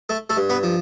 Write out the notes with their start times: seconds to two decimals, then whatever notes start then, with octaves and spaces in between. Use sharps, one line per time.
0.09 A3 A4
0.30 A3 A4
0.37 G2
0.49 B3 B4
0.63 F3